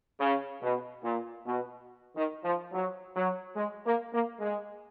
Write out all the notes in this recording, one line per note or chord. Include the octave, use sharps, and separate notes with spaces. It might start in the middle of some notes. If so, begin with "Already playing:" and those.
C#3
B2
A#2
B2
D#3
F3
F#3
F#3
G#3
A#3
A#3
G#3